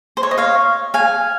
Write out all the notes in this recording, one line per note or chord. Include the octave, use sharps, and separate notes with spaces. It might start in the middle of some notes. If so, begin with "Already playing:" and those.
C5
C#5
D#5
C#5 F5
F5 G#5